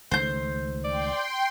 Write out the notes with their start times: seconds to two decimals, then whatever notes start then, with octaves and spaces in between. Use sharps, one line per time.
0.11 C#2 D#3 A3 C5 G6
0.84 D5 G5 C6